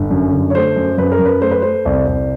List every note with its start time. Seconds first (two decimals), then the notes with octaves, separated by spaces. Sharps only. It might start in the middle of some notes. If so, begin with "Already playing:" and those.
Already playing: G1
0.11 F#2
0.32 D3
0.50 C#5
0.55 A3 C5
0.76 F#2
0.98 F#2 B4
1.12 A#4
1.19 F#2
1.25 B4
1.41 A3 C5
1.51 B4
1.62 A3 C5
1.85 C2
2.07 C2